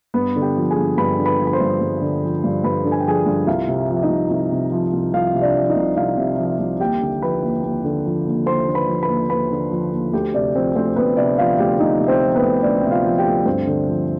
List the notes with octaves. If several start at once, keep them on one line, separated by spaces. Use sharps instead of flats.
G2 B3 B4
D3
G4 G5
F3
G#4 G#5
G2
G2 B4 B5
D3
B4 B5
F3
B5
C5 C6
G2
G2
D3
F3
G2
G2 B4 B5
D3
G#5
G5
F3 G#4 G#5
G2
C2 F4 F5
C3
F3
D#4 D#5
C2
C2
C3
F3
C2
C2 F4 F5
C3
D4 D5
F3
D#4 D#5
C2
C2 F4 F5
C3
F3
C2
D#2 G4 G5
D3
F3 B4 B5
D#2
D#2
D3
F3
D#2
D#2 C5 C6
D3
B4 B5
F3
B4 B5
D#2
D#2 B4 B5
D3
F3
D#2
D2 G4 G5
C3 D4 D5
F3 C4 C5
D2 C4 C5
D2 B3 B4
C3 D4 D5
F3 F4 F5
D2 G4 G5
D2 D#4 D#5
C3
C4 C5
F3
B3 B4
D2
D2 D4 D5
C3 G5
F4 F5
F3
G4 G5
D2
G2 C4 C5
D3
F3